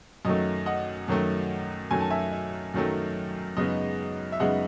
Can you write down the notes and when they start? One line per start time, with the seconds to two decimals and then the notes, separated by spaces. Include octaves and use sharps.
0.25 F#2 D#3 F#3 A3 D#5
0.66 D#5 F#5
1.08 F#2 D#3 F#3 A3
1.91 F#2 D#3 F#3 A3 G#5
2.01 A5
2.10 E5 G#5
2.32 E5
2.74 F#2 D#3 F#3 A3
3.57 F#2 C#3 G#3 B3 D#4 D#5
4.32 E5
4.40 F#2 C#3 G#3 B3 D#4 D#5 F#5